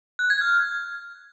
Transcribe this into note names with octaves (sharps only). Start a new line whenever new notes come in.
F#6
G#6
F6